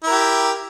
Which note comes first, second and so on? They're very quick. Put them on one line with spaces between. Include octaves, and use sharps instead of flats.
E4 A#4 G4